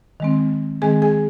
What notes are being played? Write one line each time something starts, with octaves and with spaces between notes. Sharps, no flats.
D#3 G#3 C4
D#3 G#3 C4 G#4 G#5
G#4 G#5